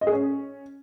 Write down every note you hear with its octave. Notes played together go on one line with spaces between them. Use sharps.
D#5
G#4
C#4